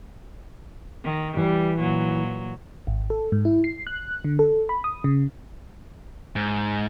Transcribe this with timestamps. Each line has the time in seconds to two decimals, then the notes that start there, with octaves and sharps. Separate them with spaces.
1.04 D#3
1.37 E3 G3
1.77 A#2 F#3
2.87 G#1
3.10 A4
3.32 G#2
3.45 E4
3.64 C7
3.87 F#6
4.24 D3
4.39 A4
4.69 B5
4.84 D#6
5.04 C#3
6.36 G#2